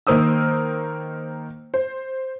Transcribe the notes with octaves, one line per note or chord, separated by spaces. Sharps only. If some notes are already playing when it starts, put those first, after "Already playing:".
D#3 A#3 A#4 C5 D#6 E6
C5